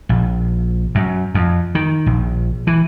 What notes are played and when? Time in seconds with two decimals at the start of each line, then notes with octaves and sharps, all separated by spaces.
0.09 A#1
0.95 F#2
1.34 F2
1.75 D#3
2.06 A#1
2.67 E3